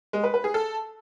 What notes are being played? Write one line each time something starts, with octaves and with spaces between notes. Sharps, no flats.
G#3
B4
B4
G#4
A4